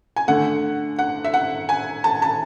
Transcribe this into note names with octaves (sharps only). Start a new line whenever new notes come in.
G#5
D3 A3 F#5
F#5
E5
F#5
G#5
A5
A5